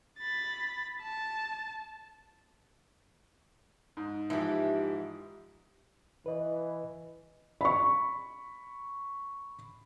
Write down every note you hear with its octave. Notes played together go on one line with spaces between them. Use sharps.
B5 A6
A5
G#2
G#2 E3 F3 E4 G4
E3 B4 D#5
B5 C#6